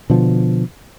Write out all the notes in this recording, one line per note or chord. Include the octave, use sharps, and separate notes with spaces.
B2 D3 F3